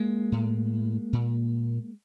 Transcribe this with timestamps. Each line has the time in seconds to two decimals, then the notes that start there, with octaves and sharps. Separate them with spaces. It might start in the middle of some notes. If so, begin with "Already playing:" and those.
Already playing: G#3 A#3
0.32 A2
1.13 A#2